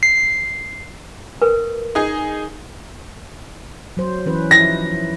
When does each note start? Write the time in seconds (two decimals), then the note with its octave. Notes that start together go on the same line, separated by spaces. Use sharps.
0.03 C7
1.42 A#4 B4
1.95 D#4 G#4
3.97 F#3 C5
4.26 E3 C#4 B4
4.51 F3 D#4 E4 A#6